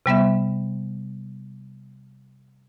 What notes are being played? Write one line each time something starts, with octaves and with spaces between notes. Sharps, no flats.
C3 G3 B3 E5